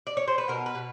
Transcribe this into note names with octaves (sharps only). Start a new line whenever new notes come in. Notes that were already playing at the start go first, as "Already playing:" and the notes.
D5
C#5
C5
B4
B2 A#4
B4
B2